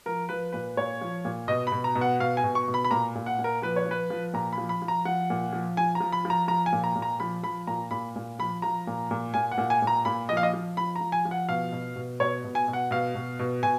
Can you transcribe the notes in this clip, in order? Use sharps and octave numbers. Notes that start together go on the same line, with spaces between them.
F3 A#4
F3 B4
A#2 B4
A#2 C#5
F3
A#2
B2 D#5
B5
B2
A#5
B2
F#5
B2 F5
G#5
B2
C#6
B2
B5
B5
A#2 A#5
A#2
F#5
A#2
A#4
F3 B4
C#5
F3
B4
F3
A#2 A#5
B5
F3
B5
F3
A#5
F3 F#5
A#2
F3
F3 G#5
A#5
F3
B5
F3
A#5
F3 A#5
G#5
A#2
A#5
A#2
A#5
F3 B5
F3 B5
A#2 A#5
A#2 B5
A#2
F3 B5
F3 A#5
A#2
A#2
A#2 G#5
F#5
A#2
G#5
A#2
A#5
A#2 B5
F3 D#5
F5
D#5
F3
F3 B5
A#5
F3
G#5
F3
F#5
B2 F5
B2
B2
B2 C#5
B2
G#5
B2
F#5
B2 F5
B2
B2
B2 G#5